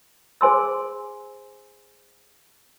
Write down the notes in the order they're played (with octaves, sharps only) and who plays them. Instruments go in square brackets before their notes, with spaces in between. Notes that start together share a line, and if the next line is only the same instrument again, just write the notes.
[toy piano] G#4 C5 G#5 C6 E6